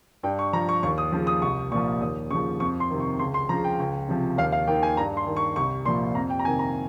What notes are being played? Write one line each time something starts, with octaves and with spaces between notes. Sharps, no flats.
G2 G5
C#6
F3 A#5
C#6
D#2 C#6
D#6
C#3 F3
D#6
C2 C#6
A#2 F3 C#6
D#2 D#6
C#3 F3 C#6
F2 C#6
C6
C3 D#3
C#6
C#2 C6
C6
C#3 F3 A#5
G5
C#2
C3 F3
D#2 F5
F5
D#3 G5
G#5
G2 A#5
C6
D#3
C#6
C2 C#6
A#2 F3 C6
F2 A#5
G5
A#5
C3 D#3 G#5
A#5